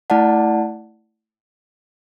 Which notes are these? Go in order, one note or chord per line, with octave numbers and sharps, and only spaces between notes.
A3 E4 D5 F#5 A5